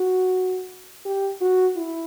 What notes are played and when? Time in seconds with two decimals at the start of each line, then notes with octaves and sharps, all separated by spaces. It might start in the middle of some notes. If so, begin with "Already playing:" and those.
Already playing: F#4
1.05 G4
1.41 F#4
1.76 E4